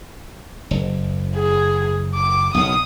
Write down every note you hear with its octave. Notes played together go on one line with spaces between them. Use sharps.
F#1
G#4
D6
B1 C#3 D#6